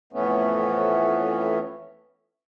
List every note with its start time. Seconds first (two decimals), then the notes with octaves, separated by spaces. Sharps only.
0.13 F2 A2 E3 A3 B3 C#4